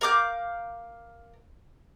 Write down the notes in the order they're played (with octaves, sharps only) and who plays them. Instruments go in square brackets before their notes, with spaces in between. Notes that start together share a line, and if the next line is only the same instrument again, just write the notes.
[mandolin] A#4 F5 D6 G6